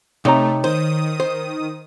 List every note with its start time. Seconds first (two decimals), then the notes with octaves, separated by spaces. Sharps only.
0.25 C3 A3 D#4 C#5 A#5
0.64 D#3 C5 D#6
1.20 C5